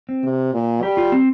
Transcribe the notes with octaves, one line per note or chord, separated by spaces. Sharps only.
C4
C3
A#2
G3 G4
F4
C4